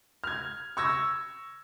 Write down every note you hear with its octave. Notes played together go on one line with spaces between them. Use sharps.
F6 G#6
C#6 E6 G#6 A#6